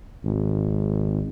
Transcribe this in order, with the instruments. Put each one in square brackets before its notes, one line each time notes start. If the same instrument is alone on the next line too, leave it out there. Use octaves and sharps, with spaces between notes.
[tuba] G#1